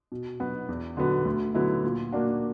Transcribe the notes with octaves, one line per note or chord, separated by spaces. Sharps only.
B2
F#3 B3 F#4
E2
D3 F#3 B3 F#4
D2
D3 F#3 B3 E4
A#2
A#3 D4 F#4